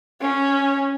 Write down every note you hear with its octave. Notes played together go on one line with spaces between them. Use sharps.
C#4